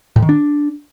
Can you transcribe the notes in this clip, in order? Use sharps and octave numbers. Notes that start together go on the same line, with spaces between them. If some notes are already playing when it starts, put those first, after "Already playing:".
A2
D#3
D4